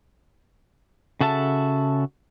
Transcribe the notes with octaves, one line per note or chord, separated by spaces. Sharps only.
C#3 F#4 A4 E5 A5